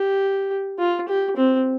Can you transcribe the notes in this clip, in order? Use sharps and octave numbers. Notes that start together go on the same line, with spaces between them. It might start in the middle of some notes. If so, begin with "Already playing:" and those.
Already playing: G4
F4
G4
C4